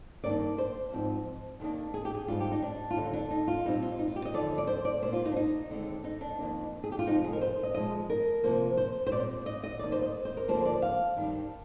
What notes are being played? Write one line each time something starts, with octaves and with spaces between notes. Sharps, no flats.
G2 D#3 A#3 D4 D5
C5
G#2 F3 C4
D#2 D#3 A#3 D4
G#4
G4
G#4
G#2 G3 D4 F4
G4
D#4
D4
F4
D#2 D3 G3 D#4
D4
D#4
F4
A#2 G3 C4 D#4
F4
D#4
F4
G4
D#5
D#2 D3 F3 D5
D5
C5
D5
A#2 G3 A#3 C5
F4
D#4
D4
D#4
D#2 D3 G#3 C4
D#4
D4
F2 D#3 A#3 D4
G#4
G4
F4
F2 C3 F3 G#3 D#4
G#4
A#4
C5
D#5
A#2 F3 G#3 D#5
A#4
C3 F3 A#3 C5
C5
C5
A#2 G3 C4 D5
D#5
D#5
F2 D#3 A#3 D5
C5
D#5
C5
A#4
D2 D3 F3 A#3 D4 C5
D5
F5
G2 D#3 G3 D4